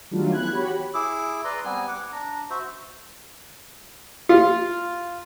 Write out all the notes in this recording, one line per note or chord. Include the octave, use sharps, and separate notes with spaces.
D#3 F#3 G3 A3 D4 F4
E3 B3 B5 F#6 G#6
F#4 G4 C#5 B5
E4 G#4 D6 E6
B4 D5 A#5 C6
G3 B3 C4 G#5
F#5 D6
D4 A#5
F#4 C5 E5
F4